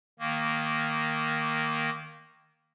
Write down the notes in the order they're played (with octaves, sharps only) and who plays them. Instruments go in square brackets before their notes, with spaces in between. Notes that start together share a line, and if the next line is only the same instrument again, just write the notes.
[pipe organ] D#3 A#3